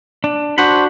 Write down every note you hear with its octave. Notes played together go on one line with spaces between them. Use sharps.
D4
D4 F#4 C5 F#5 B5